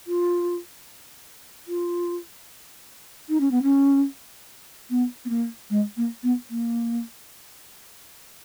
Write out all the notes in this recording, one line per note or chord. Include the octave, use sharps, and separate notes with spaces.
F4
F4
D#4
C#4
B3
C#4
B3
B3
A#3
G#3
A#3
B3
A#3